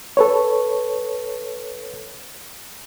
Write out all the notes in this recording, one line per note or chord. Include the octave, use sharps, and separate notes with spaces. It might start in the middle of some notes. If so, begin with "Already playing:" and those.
A4 B4 C#5